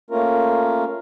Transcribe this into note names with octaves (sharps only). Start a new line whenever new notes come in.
A3 A#3 C#4 F4 A#4